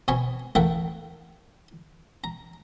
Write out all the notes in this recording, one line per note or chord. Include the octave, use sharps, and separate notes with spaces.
B2 C4 G#5 B5 C#6
E2 A3 A#3 E5 F#5 G5
A#5